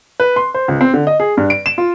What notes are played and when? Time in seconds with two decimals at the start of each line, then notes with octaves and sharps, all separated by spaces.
0.20 B4
0.36 C6
0.54 C5
0.68 C#2
0.81 C4
0.94 D3
1.07 D#5
1.20 G#4
1.37 G2
1.50 D7
1.66 E7
1.78 F4